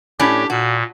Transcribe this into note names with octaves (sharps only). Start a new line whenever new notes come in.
A2 C#4 D4 G4
A#2 F#4